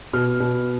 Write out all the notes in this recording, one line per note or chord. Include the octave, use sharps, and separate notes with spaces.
B2 F6
B2